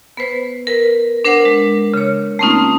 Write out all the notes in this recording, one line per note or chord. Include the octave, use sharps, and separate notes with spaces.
B3 B4 C5
A#4 B4
D4 A#4 C5 F#5
G#3
C#3 C#5
A3 A#3 C4 C#4 D#4 F4